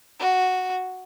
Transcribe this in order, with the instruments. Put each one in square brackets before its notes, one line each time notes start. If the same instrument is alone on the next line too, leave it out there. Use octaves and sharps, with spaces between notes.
[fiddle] F#4